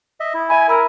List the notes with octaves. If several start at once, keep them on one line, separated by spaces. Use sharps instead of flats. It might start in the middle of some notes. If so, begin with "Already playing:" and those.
D#5 E5
E4
E5 G#5 B5
A#4 B5 E6